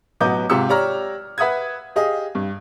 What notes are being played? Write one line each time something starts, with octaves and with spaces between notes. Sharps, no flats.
A1 F#3 B3 D#5 D6 G6
G#2 C3 F4 G4 E6 C#7
G4 C#5 D5 A#5 F6
B4 E5 F#5 D#6 G#6
G4 G#4 D#5 F5
G2